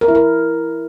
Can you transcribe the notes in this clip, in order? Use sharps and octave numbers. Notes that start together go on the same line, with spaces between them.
A#4
E4
A#4